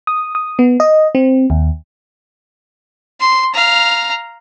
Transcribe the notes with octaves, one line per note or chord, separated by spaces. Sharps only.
D#6
D#6
B3
D#5
C4
D#2
C6
F5 A#5